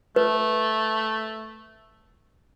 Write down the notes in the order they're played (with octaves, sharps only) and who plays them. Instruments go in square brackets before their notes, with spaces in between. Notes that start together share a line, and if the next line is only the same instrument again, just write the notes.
[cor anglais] A3 [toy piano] B4